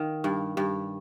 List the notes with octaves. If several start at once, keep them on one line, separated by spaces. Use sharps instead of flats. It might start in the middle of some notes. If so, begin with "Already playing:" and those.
Already playing: D#3 F5
G2
G2